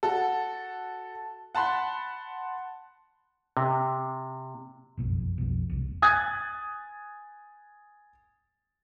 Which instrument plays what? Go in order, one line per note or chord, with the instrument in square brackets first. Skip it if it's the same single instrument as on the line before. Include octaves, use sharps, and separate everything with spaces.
[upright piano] F#4 A4
F#5 A5 B5 C6 F#6
[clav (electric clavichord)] C3
[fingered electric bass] F#1 B1 F2
B1 F2
E1 C2
[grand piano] G#5 D#6 F#6 G#6 A6